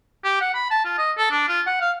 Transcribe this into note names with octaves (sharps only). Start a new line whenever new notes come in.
G4
F#5
B5
A5
F4
D#5
A4
D4
F4
F#5
F5